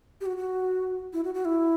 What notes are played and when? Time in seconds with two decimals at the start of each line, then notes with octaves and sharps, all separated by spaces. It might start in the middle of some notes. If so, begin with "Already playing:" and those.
0.21 G4
0.26 F#4
0.37 F#4
1.13 E4
1.24 F#4
1.34 F#4
1.45 E4